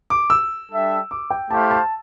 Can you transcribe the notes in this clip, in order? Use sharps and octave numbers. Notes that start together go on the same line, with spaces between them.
D6
E6
G3 D4 A4 E5 G5
D6
G5
A3 E4 G4 C5 F5 A5
A5